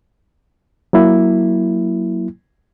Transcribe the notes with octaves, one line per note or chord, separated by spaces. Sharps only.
F#3 A#3 E4